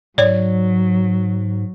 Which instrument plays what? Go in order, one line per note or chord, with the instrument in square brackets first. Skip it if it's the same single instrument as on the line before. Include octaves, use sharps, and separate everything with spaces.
[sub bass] G#2 [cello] F#3 [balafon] C#5 D5